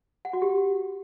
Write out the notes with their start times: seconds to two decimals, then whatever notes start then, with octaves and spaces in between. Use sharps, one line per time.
0.25 F#5
0.33 F#4
0.42 G4